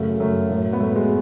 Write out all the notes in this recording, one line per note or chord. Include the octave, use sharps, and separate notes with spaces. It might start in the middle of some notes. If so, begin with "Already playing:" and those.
Already playing: F#2 C#3 F#3 A3
F#2 C#3 F#3 A3
A2 F#3
B3
A2 F#3 A3
G#3